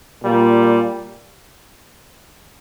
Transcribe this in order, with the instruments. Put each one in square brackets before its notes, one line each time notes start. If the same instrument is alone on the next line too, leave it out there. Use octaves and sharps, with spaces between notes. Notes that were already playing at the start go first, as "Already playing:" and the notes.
[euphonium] A#2 [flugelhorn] G3